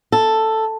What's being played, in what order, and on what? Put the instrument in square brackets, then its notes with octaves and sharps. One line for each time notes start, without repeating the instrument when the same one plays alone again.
[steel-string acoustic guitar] A4